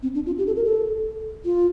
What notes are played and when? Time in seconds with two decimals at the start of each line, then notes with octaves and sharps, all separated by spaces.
0.03 C4
0.15 D4
0.26 F4
0.38 G4
0.47 A4
0.56 A#4
0.65 A4
1.45 F4